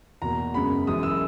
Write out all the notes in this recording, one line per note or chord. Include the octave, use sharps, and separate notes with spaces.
E2 B2 A#3 A#5
F#2 C#3 G#3 B3 B5
F#1 F#2 E3 G#3 D#6
E6